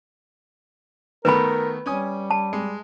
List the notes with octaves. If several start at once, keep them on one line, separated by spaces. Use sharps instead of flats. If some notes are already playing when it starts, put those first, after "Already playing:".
D#3 A3 B3 A#4 B4 B5
G3 C#4 G#5 D#6
A5
G#3